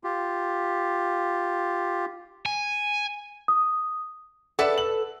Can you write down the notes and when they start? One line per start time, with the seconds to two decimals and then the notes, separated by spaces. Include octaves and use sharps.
0.04 F4 G4
2.46 G#5
3.48 D#6
4.59 A4 B4 D5 E5 F#5
4.78 F#7